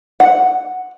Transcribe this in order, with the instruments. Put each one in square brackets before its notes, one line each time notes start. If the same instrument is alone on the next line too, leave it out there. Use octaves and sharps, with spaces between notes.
[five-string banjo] F#5